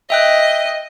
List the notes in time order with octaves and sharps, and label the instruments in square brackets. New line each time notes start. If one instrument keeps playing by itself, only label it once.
[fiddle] D#5 [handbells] E5 G5 F#6